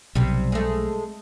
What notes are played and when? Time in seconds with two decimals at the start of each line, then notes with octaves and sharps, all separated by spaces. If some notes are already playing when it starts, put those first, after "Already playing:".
0.15 B1 C3 G3
0.52 G#3 A3